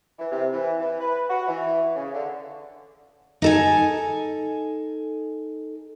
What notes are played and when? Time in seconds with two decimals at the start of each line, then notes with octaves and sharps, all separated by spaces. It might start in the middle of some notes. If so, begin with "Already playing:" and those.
0.19 E3
0.32 C3
0.53 E3
0.79 E3
1.00 B4
1.29 F#4
1.48 E3
1.95 C#3
2.14 D3
3.42 D#4 A4 G#5